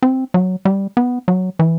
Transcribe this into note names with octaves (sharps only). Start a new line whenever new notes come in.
C4
F#3
G3
B3
F#3
E3